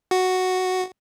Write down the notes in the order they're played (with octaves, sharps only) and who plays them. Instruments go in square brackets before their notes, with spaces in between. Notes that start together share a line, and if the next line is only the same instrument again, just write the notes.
[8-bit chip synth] F#4